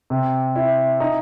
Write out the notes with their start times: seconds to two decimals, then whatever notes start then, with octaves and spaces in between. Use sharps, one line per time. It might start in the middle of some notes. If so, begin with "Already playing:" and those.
0.10 C3
0.56 E4
1.00 D#4